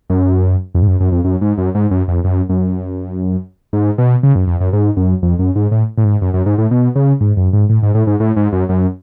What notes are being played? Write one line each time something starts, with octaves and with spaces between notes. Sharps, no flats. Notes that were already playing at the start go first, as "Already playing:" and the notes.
F#2
F2
G#2
F#2
F#2
F2
F#2
G#2
F#2
G#2
F#2
F2
F#2
F#2
G#2
B2
C#3
F#2
F2
F#2
G#2
F#2
F2
F#2
G#2
A2
A2
G#2
F#2
F#2
G#2
A2
B2
C#3
G#2
F#2
G#2
A2
G#2
A2
G#2
A2
G#2
F#2
F#2